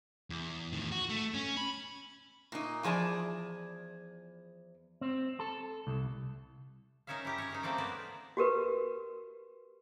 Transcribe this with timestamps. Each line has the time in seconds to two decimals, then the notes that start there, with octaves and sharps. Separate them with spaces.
0.30 E2
0.72 A2 D#3
0.92 F#4
1.09 A3
1.34 C#4
1.57 B5
2.52 A#2 D#4
2.83 E2 F3 G#4 D5 A5
5.01 C4
5.40 A4
5.87 C2
7.07 C#4 D#4 A#4 C#5 E5 F5
7.25 E4 G4 A#5
7.38 C#4 A#4 C#5
7.50 D#4 G#4 A#4
7.63 A3 A#3 C4 A#4 D5
7.78 B3 A#4 C5 D5
8.37 F#4 G4 A#4 B4